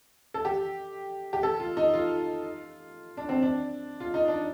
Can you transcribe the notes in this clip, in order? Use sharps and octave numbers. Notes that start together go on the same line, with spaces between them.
A4
G4
G4
A4
F4
D#4
F4
D4
C4
D4
F4
D#4
D4